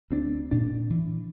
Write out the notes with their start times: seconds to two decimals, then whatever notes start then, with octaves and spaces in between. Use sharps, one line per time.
0.11 D2 C4 D4
0.51 A#2 D4
0.90 E3